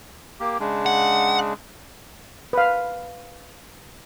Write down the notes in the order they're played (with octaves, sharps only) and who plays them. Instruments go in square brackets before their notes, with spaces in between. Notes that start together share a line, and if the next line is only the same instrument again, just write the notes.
[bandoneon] A#3 G4
C#3 G#3 D4
[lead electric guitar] F#5
[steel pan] B4 F5